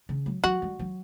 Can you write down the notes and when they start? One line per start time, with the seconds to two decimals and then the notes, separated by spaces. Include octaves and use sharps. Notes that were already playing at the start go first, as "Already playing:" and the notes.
0.09 C#3
0.26 F#3
0.44 F#3 F#4
0.62 G3
0.79 F#3